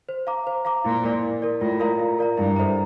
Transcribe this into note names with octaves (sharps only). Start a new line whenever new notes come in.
C5
F5 A#5 D6
C5
F5 A#5 D6
A#2 E4
A#4 D5
E4
A#4 D5
A2 F4
A#4 D5 F5 A#5
F4
A#4 D5 F5 A#5
G2 E4
A4 C5 E5 A#5